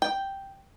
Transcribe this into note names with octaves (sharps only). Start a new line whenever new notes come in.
G5